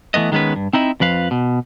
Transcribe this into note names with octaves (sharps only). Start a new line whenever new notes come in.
E3 A3 B3 D#5
D#3 G#3 B3 C#4 B4
G2
C4 D#4 E4 D#5
F2 F3 B4 F5
B2